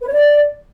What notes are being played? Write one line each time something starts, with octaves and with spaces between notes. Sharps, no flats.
B4
C#5
D5